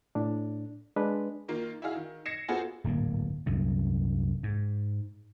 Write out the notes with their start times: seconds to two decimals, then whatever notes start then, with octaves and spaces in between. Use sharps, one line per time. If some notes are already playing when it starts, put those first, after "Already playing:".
0.15 A2 D4
0.96 G#3 D4 B4
1.48 D#3 A#3 F4
1.82 E4 F#4 G#4 F5
1.95 D#3
2.26 G#6 A#6 C7 C#7 E7
2.48 B3 F4 F#4 G#4 A4 C5
2.84 D1 G1 G#2 A#3
3.46 C2 F#2 A#2
4.43 G#2